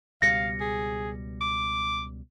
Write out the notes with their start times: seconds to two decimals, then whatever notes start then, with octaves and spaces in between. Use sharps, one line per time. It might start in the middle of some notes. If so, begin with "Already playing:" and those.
0.22 C#2 B2 G3 F5 A#6 C#7
0.61 G#4
1.41 D6